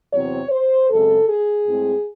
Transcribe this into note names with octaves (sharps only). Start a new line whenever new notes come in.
E2 C3 F#3 C4 C#5
C5
F#2 C#3 G#3 C4 A4
G#4
A2 G#3 C4